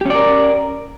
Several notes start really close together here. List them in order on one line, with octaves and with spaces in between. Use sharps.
G4 C#4 D5 A#4